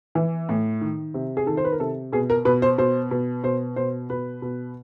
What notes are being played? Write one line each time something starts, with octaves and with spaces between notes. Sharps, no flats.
E3
A2
D#3
C3
G#4
D#3 A4
C5
B4
A#4
C3 A4
B2 G#4
A#4
B2 B4
C5
B2 C5
B2
B2 C5
B2 C5
B2 B4
B2